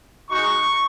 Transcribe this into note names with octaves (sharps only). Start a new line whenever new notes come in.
G#3 D#4 F#4 C#6